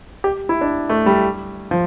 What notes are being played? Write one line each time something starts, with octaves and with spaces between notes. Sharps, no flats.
G4
E4
D4
A3
G3
F3